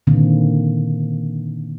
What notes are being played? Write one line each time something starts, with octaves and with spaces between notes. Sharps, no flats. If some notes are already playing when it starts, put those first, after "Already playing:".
A#2 D3 D#3 A#3 C4